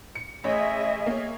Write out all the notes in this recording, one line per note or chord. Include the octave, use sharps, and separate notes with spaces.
C#7
A1 G#4 C#5 D#5 E5
A#3 C#5